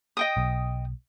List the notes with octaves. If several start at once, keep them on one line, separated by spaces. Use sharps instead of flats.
D#5 G5 D#6
B1